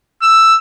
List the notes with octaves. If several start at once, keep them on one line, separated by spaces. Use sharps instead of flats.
E6